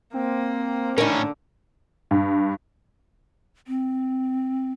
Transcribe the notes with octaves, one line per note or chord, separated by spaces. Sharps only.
A#3 C4
A2 D3 C#4 D#4 A#4
G2
C4